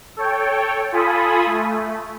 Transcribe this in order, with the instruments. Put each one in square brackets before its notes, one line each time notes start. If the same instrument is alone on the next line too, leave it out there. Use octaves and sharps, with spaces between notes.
[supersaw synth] A4 C#5 G5
F4 A4 G#5 B5 D#6
A3